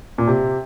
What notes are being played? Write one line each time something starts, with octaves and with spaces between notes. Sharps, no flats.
A#2
C3